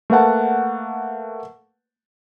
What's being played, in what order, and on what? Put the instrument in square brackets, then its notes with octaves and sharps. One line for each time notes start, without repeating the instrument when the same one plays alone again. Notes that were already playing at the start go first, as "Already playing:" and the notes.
[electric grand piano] A3 A#3 B4 F#5 A5